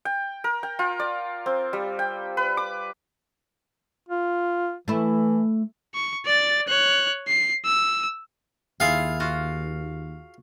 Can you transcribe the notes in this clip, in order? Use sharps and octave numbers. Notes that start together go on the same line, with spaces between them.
G5
A#4
G5
F4
D5
C4
G3
G5
B4
D6
F4
E3 A3 E4
C#6
D5 A6
C#5 F#6
C7
E6
D#2 E4 F4 G#4 F5
F4 F#4